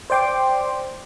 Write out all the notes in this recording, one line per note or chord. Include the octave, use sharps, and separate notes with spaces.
C5 D5 G5 C6 D6